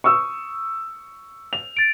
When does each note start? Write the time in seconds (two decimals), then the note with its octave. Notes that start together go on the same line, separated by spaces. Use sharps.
0.04 C#6 D#6 E6
1.53 F7
1.77 A6 D7